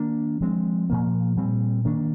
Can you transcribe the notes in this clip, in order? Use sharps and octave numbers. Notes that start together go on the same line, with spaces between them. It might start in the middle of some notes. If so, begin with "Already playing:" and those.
Already playing: D#3 A#3 D4
F3 G#3 C4
A#2 F3 A#3
A#2 G3 C4
D#3 A#3 D4